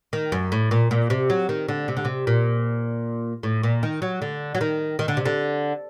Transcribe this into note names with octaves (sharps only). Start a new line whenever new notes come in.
D#3
F#2
A2
A#2
A#2
C3
F#3
D#3
D3
C3
D3
C3
A#2
A2
A#2
D#3
F#3
D3
F#3
D#3
D#3
D3
C3
D3